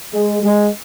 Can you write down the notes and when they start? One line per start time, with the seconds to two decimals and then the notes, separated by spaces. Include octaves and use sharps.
0.12 G#3
0.42 G#3